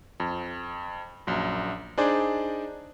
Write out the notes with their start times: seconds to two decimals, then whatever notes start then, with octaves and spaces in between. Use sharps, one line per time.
0.20 F2
1.27 A#1 F#2
1.98 D4 D#4 G#4 C5 D5